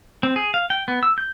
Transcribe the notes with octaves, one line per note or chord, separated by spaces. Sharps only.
C4
G#4
F5
G5
B3
E6
G6